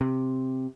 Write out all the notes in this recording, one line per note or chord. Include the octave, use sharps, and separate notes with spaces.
C3